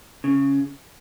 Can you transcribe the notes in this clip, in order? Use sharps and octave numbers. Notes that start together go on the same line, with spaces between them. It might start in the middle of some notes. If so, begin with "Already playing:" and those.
C#3